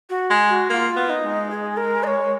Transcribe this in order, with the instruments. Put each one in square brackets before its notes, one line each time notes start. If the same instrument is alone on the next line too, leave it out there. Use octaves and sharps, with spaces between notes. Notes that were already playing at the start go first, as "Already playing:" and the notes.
[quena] F#4
[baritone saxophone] G#3
[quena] F#4
[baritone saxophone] A#3 [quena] F4 F#4
[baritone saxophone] B3
[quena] D#4
[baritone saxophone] G#3
[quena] G#4
A#4
D#5
C#5